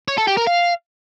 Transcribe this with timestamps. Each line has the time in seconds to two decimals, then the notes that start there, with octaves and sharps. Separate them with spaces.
0.08 C#5
0.18 A4
0.27 G4
0.37 A#4
0.47 F5